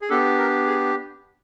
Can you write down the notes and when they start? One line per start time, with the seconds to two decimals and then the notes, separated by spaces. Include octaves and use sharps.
0.02 G#4
0.09 B3 D4 G4 A4
0.38 A#4
0.67 G#4